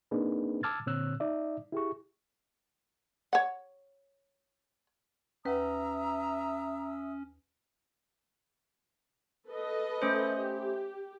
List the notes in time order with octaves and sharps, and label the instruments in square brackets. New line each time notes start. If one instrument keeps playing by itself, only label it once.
[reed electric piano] A#3 C4 D4 D#4 G#4 B4
A5 D6 E6 F6 G#6 A6
A#2 D3 C4 C#5 E6 F#6
D#4 D5 E5
E4 G4 G#4 C#6
[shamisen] C#5 F#5
[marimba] D#2 B4 F#5 [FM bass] C#4 [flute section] E5 D#6 E6 [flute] A#5
[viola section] A4 B4 D#5
[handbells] A3 C#4 C5
[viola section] G4